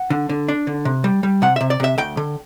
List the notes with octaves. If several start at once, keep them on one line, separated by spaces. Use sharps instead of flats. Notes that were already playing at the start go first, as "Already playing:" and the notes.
Already playing: F#5
D3
D3
D4
D3
C3
G3
G3
C3 F#5
C3 E5
D5
C3 E5
D2 G5
D3